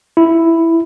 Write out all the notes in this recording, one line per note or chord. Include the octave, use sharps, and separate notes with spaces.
E4